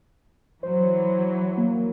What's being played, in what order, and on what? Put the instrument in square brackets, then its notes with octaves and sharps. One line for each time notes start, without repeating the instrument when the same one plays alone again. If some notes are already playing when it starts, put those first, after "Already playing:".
[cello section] E3 F#3 [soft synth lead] C5
[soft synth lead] A#3